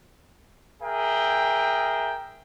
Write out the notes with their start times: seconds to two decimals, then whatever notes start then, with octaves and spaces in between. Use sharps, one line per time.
0.82 G#4 A#4 E5 G5